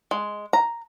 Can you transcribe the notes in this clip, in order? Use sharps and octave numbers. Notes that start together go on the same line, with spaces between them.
G#3
A#5